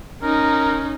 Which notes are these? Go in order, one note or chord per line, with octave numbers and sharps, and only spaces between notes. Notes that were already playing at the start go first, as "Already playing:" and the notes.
C#4 D#4 A#4